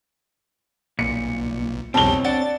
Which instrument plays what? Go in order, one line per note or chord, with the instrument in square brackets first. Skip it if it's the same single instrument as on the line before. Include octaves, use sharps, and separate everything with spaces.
[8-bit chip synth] B1 [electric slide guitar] A#2 [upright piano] C#7
[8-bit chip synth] C2 F2 G3 [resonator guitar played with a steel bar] B2 [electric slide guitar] C4 C#5 [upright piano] A5 G7
[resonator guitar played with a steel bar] D4 D5 F#5 [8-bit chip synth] A6